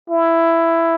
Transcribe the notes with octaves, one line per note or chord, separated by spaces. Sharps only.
E4